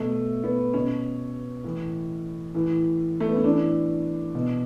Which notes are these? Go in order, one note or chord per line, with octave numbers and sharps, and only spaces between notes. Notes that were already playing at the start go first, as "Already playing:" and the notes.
Already playing: B2 A3
B3
B2 C#4
A2 E3
A2 E3
A3
B3
C#4
A2 E3 D4
B2